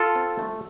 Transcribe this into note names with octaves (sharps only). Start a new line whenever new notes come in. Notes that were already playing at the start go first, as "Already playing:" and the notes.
Already playing: F4 A4
C4
A3